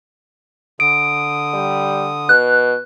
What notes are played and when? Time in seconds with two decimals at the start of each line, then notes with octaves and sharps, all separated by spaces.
0.80 D3 D#6 D7
1.54 G3
2.29 B2 F#6